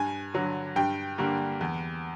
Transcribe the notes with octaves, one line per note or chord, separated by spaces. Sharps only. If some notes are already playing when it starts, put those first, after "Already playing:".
Already playing: G2 G#5
D3 F#3
G2 G5
D3 G3 A#3
E2